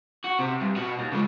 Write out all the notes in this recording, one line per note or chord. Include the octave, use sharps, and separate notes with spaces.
F#4
C3
G2
B2 F#4
D#2
C#3 G#3